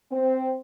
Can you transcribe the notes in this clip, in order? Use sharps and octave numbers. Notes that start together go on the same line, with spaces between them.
C4